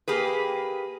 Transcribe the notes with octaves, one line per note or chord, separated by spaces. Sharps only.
A#3 G4 G#4 B4